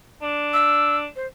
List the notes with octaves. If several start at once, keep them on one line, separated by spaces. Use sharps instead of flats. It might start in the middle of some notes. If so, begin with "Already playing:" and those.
D4
E6
C5